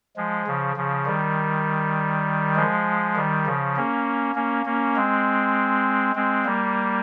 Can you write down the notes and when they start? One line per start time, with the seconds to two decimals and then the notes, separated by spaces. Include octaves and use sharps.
0.16 F3 G#3
0.47 C#3 F3
0.76 C#3 F3
1.06 D#3 G3
2.56 F3 G#3
3.16 D#3 G3
3.46 C#3 F3
3.76 A#3 C#4
4.35 A#3 C#4
4.66 A#3 C#4
4.96 G#3 C4
6.15 G#3 C4
6.45 G3 A#3